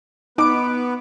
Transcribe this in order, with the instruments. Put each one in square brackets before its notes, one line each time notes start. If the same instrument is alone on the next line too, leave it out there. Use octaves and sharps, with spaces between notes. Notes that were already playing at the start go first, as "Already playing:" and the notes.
[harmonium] B3 B4 [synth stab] D#4 D7 [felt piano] D6